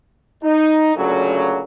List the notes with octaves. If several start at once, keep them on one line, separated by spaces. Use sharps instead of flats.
D#4
D2 A#2 C#3 F#3